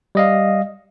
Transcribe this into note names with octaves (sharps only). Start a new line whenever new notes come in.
G3 D#5 F5